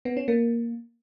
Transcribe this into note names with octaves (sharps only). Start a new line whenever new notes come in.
B3
C#4
A#3